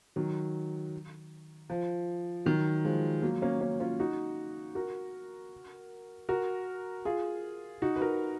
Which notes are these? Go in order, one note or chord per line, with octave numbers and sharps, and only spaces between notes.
D#3 F#3
F3
D#3 F#3
F3 G#3
F#3 A#3
A#3 C#4
A#3 C#4
C#4 F4
D#4 F#4
F#4 A#4
F#4 A#4
F4 G#4
D#4 F#4
B4
F#4 A#4